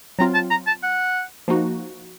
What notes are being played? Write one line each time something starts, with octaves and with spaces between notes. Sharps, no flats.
F#3 C4 F4 A#5
A5
A#5
A5
F#5
F3 A#3 D#4 F#4